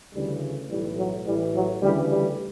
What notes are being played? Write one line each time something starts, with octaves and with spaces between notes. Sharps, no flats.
D2 C#3 E3 G3
B1 A2 E3 G3
F#3
A1 A2 E3 G3
F#3
D2 C#3 E3 G3
G3